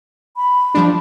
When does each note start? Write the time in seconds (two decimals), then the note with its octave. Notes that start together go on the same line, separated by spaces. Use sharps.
0.36 B5
0.75 F3 G3 D4